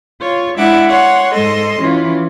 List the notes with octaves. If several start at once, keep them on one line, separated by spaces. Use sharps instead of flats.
F4 C#5
G#3 D4 E4 E5 F#5 D6
C#5 F#5 C6
G#2 G#3 A4 D#5 C6
E3 C#4 F4